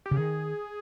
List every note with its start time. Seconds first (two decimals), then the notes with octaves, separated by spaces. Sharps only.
0.06 G4
0.11 C#3
0.17 D#3 G#4